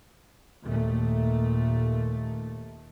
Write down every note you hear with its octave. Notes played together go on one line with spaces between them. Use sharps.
D#2 A#2 A3